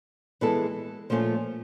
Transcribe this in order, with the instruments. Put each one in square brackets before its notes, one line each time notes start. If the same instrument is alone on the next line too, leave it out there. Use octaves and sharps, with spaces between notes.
[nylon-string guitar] E3 G#3 B3 E4 A4
A#2 F3 A3 C#4 F4